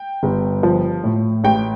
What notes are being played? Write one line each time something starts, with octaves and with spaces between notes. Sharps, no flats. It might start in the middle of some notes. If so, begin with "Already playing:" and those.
Already playing: G5
G1
F3
A2
A1 G5